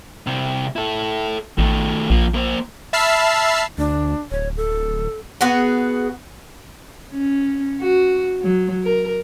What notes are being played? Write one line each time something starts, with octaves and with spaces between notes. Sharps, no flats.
C2 C3
E4 A4
A1 D#3 A3
A#1 F3 A#3
A#3 C5
E5 A5 B5 E6 F6 C7
D2 D4
D1 C#5
A4
B3 F#4 G#4
C#4
F#4
F#3
A#4